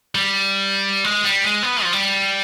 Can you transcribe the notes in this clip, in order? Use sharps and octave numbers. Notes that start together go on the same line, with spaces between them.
G3
G#3
G3
G#3
B3
F3
G3